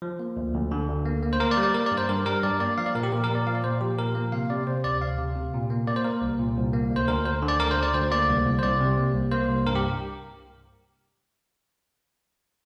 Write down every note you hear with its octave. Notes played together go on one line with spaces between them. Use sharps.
F3
A#3
D2
D2
D3
D2
A#3
A#3
C5
A#3 A#4
D5
G3
D5
A#3 A#4
D5
G2
C5
G2 A#4
G3 A#4
G2 D5
A#3 D5
F3 F5
D5
A#2 A#4
G4
A#2 A#4
A#4
A#2
D5
F3 F5
D5
A#2 C5
F3 G4
A#2 A#4
A#3
C3 F5
C3 D5
C3 C5
D2 D5
D2 F5
C3
C3
A#2
A#3
A#3 D5
C5
A#3 A#4
C2
A#2
C2
A#3
D2
C5
D2 A#4
D2 C5
D3
D5
D2 A#4
C5
D2
D5
D2 C5
A#3 D5
C2
C2
C5
C2 D5
C3
A#3
C2
A#3 C5
C2
G2 A#4
G4